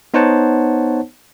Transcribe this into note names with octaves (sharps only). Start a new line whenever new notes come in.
B3 D#4 C5 C#5 F#5 A5